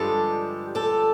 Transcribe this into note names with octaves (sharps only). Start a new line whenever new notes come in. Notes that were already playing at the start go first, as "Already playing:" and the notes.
Already playing: G2 D3 F3 G#3 G4 A4
G4 A4